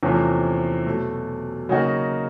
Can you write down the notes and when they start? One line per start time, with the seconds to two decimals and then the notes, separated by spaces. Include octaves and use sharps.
0.03 E2 C3 F3 A3 C#4
0.86 B2 F#3 A3
1.69 C#3 F#3 A#3 D#4 F#4